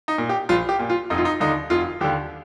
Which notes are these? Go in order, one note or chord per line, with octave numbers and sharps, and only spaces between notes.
D#4
A#2
G4
A#1 F4
G4
A#2
F4
F1 D#4
F4
D#4
D#2 D3 D#4
F1 F4
D#2 D3 G4